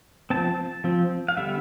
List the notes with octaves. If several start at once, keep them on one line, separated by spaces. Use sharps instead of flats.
F3 C4 A5
F3 C4
F5
D3 G3 B3 E5